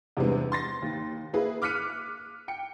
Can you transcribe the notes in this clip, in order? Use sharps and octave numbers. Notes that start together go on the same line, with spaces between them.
E2 C3 G3 G#3 B3 D4
C6 A6 A#6
D#2
A#3 E4 G#4 B4
D6 F6 F#6 B6 C#7 D#7
G5 C#7